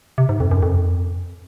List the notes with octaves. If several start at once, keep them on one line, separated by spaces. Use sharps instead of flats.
C3
G#2
F2
F#2
F2